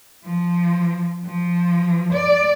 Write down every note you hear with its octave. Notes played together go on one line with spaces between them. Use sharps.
F3
F3
D5